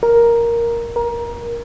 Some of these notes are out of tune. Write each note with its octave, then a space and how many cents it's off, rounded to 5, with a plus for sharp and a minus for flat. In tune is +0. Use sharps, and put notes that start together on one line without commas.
A#4 +5
A#4 +20